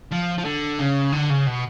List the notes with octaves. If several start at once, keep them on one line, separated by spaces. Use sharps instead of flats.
F3
F3
D3
C#3
D3
C#3
B2